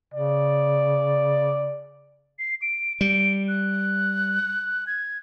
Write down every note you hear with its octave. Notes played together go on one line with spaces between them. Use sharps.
C#3 D5
C7
D7
G3 D7
F#6
G#6